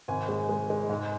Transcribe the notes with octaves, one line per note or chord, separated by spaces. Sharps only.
G#1 G#5
G#3
G#3
G#3
G#2